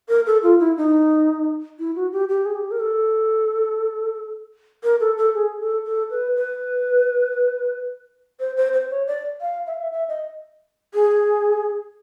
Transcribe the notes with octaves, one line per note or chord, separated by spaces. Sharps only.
A#4
A4
F4
E4
D#4
E4
F#4
G4
G4
G#4
G4
A#4
A4
A#4
A4
A4
G#4
A4
A4
B4
B4
C5
C5
C5
C#5
D5
F5
E5
F5
E5
E5
D#5
G#4